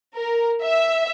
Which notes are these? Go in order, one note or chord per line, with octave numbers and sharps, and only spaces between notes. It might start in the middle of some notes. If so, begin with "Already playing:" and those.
A#4
E5